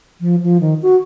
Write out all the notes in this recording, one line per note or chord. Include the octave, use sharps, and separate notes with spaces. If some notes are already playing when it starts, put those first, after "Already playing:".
F3
F3
D#3
F#4